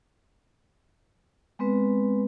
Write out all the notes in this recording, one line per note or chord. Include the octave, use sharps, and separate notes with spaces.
G#3 B3 C4 B4